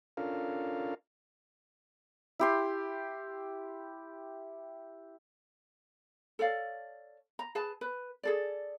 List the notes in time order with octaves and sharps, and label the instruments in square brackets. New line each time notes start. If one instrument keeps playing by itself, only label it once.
[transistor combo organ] C#4 D4 F4 A4 A#4 F5
[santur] E4 G4 C6
[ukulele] A4 C#5 D5 F5
A#5
G#4 B4 A5
B4
G#4 A4 D5